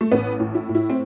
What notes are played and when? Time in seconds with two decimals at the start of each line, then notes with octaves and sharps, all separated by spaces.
0.01 A3
0.12 A1 B3
0.40 A2
0.55 E4
0.69 A2
0.75 E4
0.90 C4